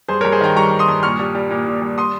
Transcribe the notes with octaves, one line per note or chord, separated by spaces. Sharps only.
G2 G#4 C5
A#4 C#5
G2
G#4 C5
D#3 G5 A#5
G3 A#5 C#6
G2
C6 D#6
G2
A#2 C#6 F6
G3
G3
A#2
A#2
G3
C6 D#6